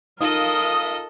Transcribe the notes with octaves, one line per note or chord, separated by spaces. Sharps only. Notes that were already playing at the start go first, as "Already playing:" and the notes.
D#4 F4 A4 A#4 D#5 F5 D#6